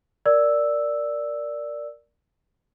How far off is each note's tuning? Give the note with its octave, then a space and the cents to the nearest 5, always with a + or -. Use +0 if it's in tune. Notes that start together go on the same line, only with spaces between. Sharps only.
A#4 +0 D5 +0 E6 +0